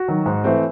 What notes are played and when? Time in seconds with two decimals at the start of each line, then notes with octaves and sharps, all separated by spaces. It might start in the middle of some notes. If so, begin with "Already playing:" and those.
Already playing: F#4
0.08 D#3 F#3
0.26 G#2
0.44 E3 A3 C4